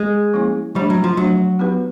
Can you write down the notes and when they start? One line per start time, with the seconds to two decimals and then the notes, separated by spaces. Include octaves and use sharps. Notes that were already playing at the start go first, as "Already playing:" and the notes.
Already playing: G#3
0.34 F3 A#3 C#4 E4
0.75 F3 G3 A3 D4
0.90 F#3
1.04 F3
1.17 F3 F#3 A3 D4
1.59 B3 D#4 G4 B4